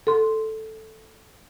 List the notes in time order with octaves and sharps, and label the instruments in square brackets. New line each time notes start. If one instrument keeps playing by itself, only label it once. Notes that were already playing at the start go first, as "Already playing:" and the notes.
[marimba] A4 C6